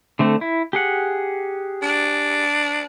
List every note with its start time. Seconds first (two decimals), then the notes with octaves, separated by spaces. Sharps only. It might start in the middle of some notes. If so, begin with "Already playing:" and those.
0.19 D3 A3 C4
0.41 E4
0.73 G4 G#4 F#5
1.82 D4